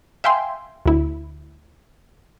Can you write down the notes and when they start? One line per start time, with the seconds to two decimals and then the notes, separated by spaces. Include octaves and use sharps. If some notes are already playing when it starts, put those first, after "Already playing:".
0.24 E5 F5 G5 G#5 C6
0.86 D2 E4